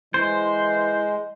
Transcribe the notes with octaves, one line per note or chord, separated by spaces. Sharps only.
E3 G#3 C5